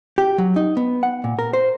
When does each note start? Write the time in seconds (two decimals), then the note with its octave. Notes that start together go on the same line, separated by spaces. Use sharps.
0.18 G4
0.38 F#3
0.56 D#4
0.77 B3
1.03 F#5
1.24 A#2
1.39 A#4
1.53 C5